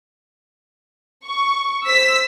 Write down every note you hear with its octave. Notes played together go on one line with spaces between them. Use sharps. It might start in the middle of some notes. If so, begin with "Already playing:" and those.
C#6
C5 E6 B6